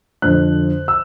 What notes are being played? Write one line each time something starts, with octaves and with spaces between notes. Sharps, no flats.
F2 D3 F3 F#6
E6